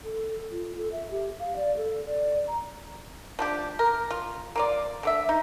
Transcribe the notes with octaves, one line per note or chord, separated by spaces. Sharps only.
A4
F4
A4
E5
G4
F5
D5
A4
D5
A#5
F3 D4 G4
A#4
F4
A#3 F4 D5
D3 D5 E5
D#4